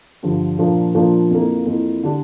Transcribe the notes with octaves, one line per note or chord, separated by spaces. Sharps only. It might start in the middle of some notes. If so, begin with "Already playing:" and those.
G2 D3 F3
A#2 F3 A#3 D4 F4
A#2 F3 A#3 D4 F4
F2 E3 A#3
F2 E3 A#3
D3 G3 D4